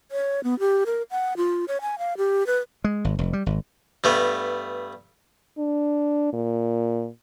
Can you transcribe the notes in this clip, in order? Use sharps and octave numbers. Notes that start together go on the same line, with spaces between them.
C#5
B3
G4
A#4
F#5
F4
C#5
G#5
F5
G4
B4
G#3
G#1
F1
G3
G#1
G2 A3 B3
D4
A#2